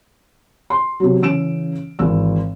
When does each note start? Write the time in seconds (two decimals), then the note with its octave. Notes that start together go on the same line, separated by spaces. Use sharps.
0.70 C6
1.00 C3 F#3
1.21 C#3 E3 C#4 E6 D7 E7
1.99 G#1 E3 E6